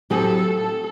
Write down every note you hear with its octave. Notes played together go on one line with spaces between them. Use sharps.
A2 F#3 A3 C4 G4 A4
A4